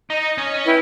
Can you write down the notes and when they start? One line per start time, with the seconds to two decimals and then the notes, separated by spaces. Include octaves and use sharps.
0.10 D#4 D#5
0.38 C#4 C#5
0.65 E4 B4 G5